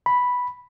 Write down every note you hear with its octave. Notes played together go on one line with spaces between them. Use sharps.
B5